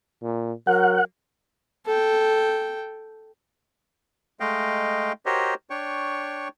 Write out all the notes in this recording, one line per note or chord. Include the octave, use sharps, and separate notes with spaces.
A#2
F#3 A#4 F#5
A4 G5
G#3 A3 D#5 F5 G5
F#4 G4 A#4 C5 C#5 D#5
D4 C#5 G5 C#6